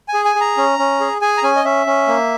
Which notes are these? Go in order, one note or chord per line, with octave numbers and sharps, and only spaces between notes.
G#5
G#4
G#5
G#4
A#5
C#4
C#4
G#4
G#4 G#5
A#5
C#4 G#5
D#5
C#4 E5
C#4
A#3